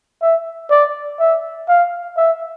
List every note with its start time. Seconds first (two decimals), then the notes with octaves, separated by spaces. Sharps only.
0.22 E5
0.70 D5
1.20 E5
1.68 F5
2.17 E5